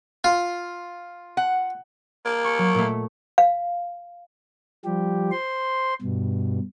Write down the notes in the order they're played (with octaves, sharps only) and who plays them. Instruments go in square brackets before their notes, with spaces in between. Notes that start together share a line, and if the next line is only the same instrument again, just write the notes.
[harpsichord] F4
[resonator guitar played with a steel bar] F#5
[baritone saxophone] A#3
[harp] C#6
F#3
A#2 A3
[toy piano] F5
[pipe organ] F3 G3 G4
C5 C6
G2 B2